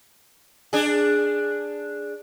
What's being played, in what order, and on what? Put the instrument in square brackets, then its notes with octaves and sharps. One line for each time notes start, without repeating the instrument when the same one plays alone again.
[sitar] D4 G#4